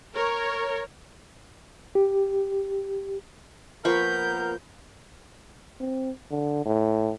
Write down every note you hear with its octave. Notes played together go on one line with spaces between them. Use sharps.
A#4 C#5
G4
F3 A#3 B3 A#4 B5 C#6 G6
C4
D3
A2